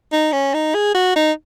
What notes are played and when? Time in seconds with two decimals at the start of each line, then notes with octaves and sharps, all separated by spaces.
0.13 D#4
0.33 C#4
0.54 D#4
0.75 G#4
0.94 F#4
1.16 D#4